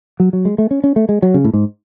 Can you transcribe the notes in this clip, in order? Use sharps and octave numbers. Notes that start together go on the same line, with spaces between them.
F#3
F#3
G#3
A3
C#4
C#4
A3
G#3
F#3
C#3
A2
G#2